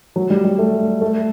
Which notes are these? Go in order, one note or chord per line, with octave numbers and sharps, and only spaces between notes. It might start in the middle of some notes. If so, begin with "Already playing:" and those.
F#3
G3
G3
A3
A3